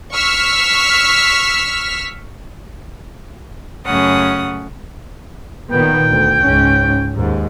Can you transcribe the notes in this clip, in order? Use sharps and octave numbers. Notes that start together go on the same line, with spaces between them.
C#6 E6 F6 B6
F#2 C#3 A3 C#4 F#5 D#6
A#2 D#3 B3 G5
D2
C#2 G#2 C#4
D#2 G#2